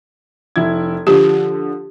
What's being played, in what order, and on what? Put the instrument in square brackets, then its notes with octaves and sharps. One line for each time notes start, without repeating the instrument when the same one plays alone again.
[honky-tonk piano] F1 E4 G#6
[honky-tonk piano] D3 F3 [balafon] G4